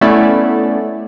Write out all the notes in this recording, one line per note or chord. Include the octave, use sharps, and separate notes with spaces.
A3 B3 C#4 E4 C#5 D5